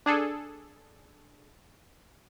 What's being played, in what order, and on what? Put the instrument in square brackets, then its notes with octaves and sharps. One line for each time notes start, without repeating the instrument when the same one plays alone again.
[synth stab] D4 G#4 A4